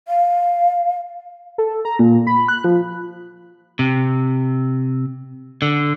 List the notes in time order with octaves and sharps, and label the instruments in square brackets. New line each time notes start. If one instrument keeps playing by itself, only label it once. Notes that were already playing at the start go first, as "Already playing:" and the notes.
[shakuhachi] F5
[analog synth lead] A4
A#5
A#2
B5
F#6
F3
[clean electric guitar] C3
D3